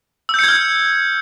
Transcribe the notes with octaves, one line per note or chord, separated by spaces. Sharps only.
E6 F6 G6 G#6 C#7